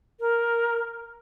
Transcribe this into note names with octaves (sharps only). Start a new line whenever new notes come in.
A#4